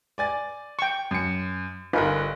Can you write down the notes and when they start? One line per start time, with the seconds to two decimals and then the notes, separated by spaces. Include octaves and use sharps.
0.18 D5 G#5 A6
0.79 G5 C#6
1.11 F#2 C#7
1.93 G1 D#4 F4 A#4 B4 G#5